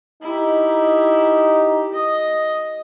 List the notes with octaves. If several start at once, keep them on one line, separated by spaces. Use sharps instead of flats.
D#4 E4 G4
D#5